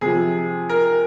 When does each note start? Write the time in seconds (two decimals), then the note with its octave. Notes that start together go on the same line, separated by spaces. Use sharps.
0.01 C3 F3 G#4
0.69 A#4